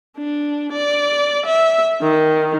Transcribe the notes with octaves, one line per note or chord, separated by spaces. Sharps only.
D4
D5
E5
D#3